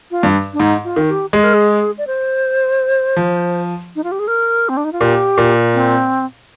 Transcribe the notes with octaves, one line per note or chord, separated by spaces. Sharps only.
F4
G2
D4
G#2 D#4
F4
D#3
G4
G#3 G#4
A#4
G#4
D5
C5
F3
D#4
F4
G4
G#4
A#4
C4
D4
D#4
F4
A#2 G4
A#2
C4